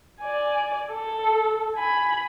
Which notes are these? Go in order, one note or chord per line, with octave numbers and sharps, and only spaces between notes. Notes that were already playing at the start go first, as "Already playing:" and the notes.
D5 G#5
A4
G#5 B5